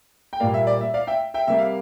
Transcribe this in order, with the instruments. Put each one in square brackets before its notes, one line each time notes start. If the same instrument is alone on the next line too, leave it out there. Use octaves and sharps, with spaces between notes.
[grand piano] G5
A#2 G3 A#3 D5 F5
E5
D5
E5
D5 F5
E5 G5
E5 G5
C3 G3 A#3 E5
F5